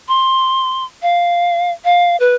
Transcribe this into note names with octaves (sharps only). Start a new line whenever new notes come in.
C6
F5
F5
B4